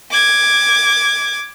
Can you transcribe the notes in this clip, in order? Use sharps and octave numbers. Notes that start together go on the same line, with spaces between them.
D6 G#6